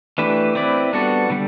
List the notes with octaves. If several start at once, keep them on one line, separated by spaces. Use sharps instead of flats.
E3 A3 D4 G4 B4
C4 E4 B4 D5
G3 B3 D4 F#4 A4
D3 G3